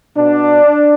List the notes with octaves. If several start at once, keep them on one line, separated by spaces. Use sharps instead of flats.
B2 D4